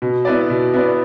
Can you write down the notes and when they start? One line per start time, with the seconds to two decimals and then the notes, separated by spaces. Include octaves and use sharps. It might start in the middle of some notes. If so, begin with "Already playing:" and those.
0.02 B2
0.25 B3 E4 B4 D5
0.50 B2
0.74 B3 E4 B4 D5